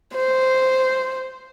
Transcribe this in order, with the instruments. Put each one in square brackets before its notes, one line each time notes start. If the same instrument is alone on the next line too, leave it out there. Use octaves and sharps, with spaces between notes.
[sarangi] C5